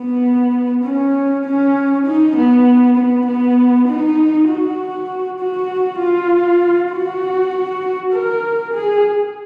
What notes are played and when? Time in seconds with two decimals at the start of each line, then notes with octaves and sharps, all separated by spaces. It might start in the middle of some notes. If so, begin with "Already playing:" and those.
Already playing: B3
0.84 C#4
1.45 C#4
2.06 D#4
2.36 B3
2.97 B3
3.27 B3
3.88 D#4
4.49 F#4
5.40 F#4
6.00 F4
6.92 F#4
8.13 A#4
8.74 G#4